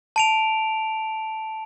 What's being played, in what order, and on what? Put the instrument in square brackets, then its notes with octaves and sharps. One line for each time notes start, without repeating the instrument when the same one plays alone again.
[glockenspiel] A5 D7 F7